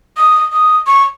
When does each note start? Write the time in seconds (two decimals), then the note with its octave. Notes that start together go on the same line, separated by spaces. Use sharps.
0.17 D#6
0.52 D#6
0.87 C#6